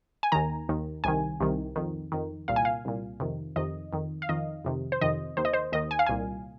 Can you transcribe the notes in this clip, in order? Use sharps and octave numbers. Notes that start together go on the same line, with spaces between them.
G#5
D#2 D#3 A#5
D#2 D#3
C2 C3 D#3 G#5
C2 C3 D#3
F2 D#3
F2 D#3
C2 A#2 F5
G#5
F5
C2 A#2
F2 C3 D#3
F2 C3 D#3 D#5
F2 D#3
F5
F2 D#3 D#5
F2 C3 D#3
C5
F2 C3 D#3 D#5
D#2 D#3 C5
D#5
C5
D#2 D#3 D#5
G#5
F5
C2 A#2 G#5